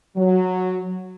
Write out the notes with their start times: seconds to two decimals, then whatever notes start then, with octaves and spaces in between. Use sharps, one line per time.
0.17 F#3